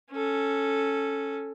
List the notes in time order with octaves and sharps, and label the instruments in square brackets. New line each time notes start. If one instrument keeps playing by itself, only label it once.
[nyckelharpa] C#4 A4